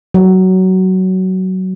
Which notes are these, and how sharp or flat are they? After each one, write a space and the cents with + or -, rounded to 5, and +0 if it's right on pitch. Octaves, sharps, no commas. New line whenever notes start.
F#3 +15